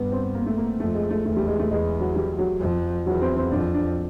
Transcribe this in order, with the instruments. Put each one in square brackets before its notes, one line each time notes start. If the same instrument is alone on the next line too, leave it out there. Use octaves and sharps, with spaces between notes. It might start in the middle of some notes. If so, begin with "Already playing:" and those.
Already playing: [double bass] G2 [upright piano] B3
[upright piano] C4
A#3
A3
A#3
[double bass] F2 [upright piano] A3
[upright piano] G#3
A3
[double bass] E2 [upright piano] A3
[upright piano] G3
G#3
A3
[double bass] E2 [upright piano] G#3
[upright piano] F#3
G3
F#3
[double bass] F2
[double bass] E2 [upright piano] F#3
[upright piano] C4
C4
[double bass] F2 [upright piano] D4
[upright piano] D4